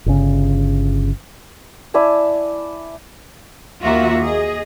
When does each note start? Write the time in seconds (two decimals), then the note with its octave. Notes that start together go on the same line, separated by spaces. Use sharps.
0.06 G1 C#3
1.94 E4 D5 G#5 A5
3.83 D#2 A#3 F4 F#4 E5
4.22 G#4 D#5